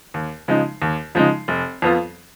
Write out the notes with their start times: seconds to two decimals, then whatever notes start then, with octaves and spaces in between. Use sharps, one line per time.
0.14 D#2
0.48 C#3 F3 G#3 D#4
0.82 D#2
1.15 C#3 F3 G#3 D#4
1.48 F1
1.82 F2 F3 B3 F4